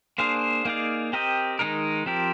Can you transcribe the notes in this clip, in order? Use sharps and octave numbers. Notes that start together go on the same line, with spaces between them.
A#3 D4 G#4 C5 F5
A#3 D#4 G#4 D5 F5
C4 G4 A#4 D#5
D#3 G#3 D#4 A#4
F3 C4 G4 A#4